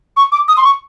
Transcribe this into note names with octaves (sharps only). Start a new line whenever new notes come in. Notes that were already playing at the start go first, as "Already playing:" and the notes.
C#6
D6
D#6
C6
C#6